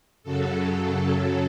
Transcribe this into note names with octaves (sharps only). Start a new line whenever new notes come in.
F#2 C#3 F#3 A4